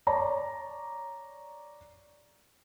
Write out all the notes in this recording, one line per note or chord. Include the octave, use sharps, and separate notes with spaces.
C#5 D5 A#5